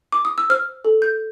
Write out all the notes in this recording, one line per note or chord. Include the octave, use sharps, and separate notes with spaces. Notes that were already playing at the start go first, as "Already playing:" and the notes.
D6
D#6
E6
C5 F6
A4
G6